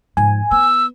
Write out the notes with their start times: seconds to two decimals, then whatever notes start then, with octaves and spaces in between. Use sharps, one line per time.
0.17 G#2 F3 G#5
0.51 B3 E6